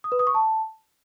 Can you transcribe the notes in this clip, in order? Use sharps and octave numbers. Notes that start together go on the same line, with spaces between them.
D#6
B4
D#6
C#6
A5